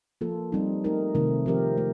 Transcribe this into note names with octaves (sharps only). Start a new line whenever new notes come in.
F3 A#3 F4 A4
G3 C4 D#4
A3 D#4 A#4
C3 D#3 A3 C4
F3 C4 G4 A#4
A3